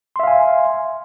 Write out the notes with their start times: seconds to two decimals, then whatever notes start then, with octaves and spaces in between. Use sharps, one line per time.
0.16 C6
0.20 E5
0.23 F5
0.27 G#5